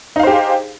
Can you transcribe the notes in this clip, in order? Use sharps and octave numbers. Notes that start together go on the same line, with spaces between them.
D#4 G4 G#4 C5 F5